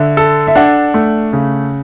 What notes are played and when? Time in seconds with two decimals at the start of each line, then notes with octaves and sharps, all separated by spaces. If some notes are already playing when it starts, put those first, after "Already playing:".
Already playing: D3 E5
0.17 A4
0.47 E5
0.55 D4 F#5
0.94 A3
1.33 C#3